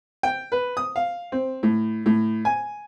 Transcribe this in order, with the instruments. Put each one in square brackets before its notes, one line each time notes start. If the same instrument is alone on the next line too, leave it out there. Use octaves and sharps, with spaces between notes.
[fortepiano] G5
B4
D#6
F5
C4
A2
A2
G#5